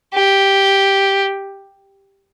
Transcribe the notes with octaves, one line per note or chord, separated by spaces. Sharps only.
G4